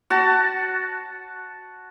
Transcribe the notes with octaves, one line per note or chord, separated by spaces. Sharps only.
F#4 A5